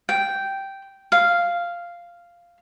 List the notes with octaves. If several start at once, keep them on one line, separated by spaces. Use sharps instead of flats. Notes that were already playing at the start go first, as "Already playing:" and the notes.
G5
F5